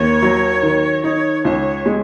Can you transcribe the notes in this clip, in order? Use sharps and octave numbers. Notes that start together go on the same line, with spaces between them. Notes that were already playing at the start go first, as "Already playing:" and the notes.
Already playing: D#2 C#5
F#3
D#3
D#4 C#5
C#2 C#5
G#3